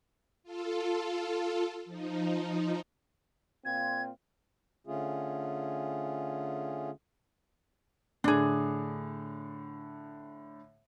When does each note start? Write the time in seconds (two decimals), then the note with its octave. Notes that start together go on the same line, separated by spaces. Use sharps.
0.43 F4 A4
1.85 F3 D#4
3.65 A#2 C4 F4 G#6
4.87 D3 A3 C#4 F4 G#4
8.24 A2 D3 D4 G#4